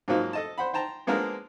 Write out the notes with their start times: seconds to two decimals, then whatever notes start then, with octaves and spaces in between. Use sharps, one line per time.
0.08 G#2 F3 F#3 A#3 D#4
0.33 A4 D#5 A5
0.58 C5 F#5 B5
0.73 C5 G5 A5 A#5
1.07 F3 G#3 A#3 B3 D4 A#4